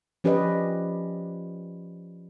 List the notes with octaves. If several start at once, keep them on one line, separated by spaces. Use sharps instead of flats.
F3 C#4 G4 B4 D5 D#5